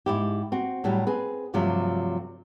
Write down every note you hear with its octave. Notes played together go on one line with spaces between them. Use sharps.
G#2 E4 G4
C4 F#4
A2 F#3 G3
C4 G#4 B4
G2 C3 F3 F#3 A3